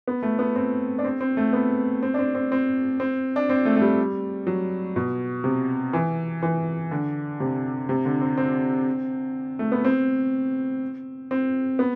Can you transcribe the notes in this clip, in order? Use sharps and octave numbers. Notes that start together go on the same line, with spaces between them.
B3
A3
B3
C4
D4
C4
C4
A3
B3
C4
D4
C4
C4
C4
C4
D4
C4
A3
A3
G3
F#3
B2
C3
E3
E3
D3
C3
C3
D3
C4
C4
A3
B3
C4
C4
B3